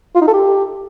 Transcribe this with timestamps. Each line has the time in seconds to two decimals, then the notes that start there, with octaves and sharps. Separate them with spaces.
0.15 F4
0.21 D#4
0.27 A4
0.33 G4